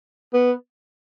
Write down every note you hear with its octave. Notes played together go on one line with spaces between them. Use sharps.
B3